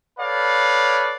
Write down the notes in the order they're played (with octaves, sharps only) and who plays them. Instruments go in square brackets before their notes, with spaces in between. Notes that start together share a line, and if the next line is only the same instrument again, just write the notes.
[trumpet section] A4 B4 C#5 D5 F5